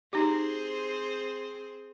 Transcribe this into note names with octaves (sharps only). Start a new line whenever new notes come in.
C4 D#4 G4 G#4 C5